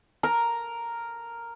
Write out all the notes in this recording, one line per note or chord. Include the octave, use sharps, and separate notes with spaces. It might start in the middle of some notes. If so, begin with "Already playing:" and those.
A#4 A#5